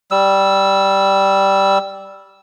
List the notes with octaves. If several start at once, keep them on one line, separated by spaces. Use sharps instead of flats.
G3 E6